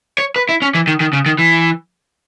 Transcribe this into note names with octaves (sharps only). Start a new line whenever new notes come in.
C#5
B4
E4
C#4
E3
D#3
D#3
C#3
D#3
E3